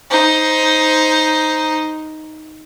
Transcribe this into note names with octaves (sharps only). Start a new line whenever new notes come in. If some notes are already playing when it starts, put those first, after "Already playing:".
D#4 C5